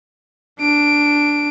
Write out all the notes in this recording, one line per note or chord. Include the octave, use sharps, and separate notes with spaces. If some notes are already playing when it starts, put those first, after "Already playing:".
D4 D7